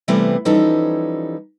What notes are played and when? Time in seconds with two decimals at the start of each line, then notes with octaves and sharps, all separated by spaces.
0.08 C3 E3 G3 A3 B3 C4
0.45 E3 F3 G3 C#4 D#4 A4